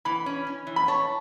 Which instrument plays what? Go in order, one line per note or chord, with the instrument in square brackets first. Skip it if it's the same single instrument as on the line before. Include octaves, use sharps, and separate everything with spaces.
[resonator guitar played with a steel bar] E3 [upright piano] B5
[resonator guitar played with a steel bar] C#4
C#4
E3
[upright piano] B5
[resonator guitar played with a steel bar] C#5 [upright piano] A5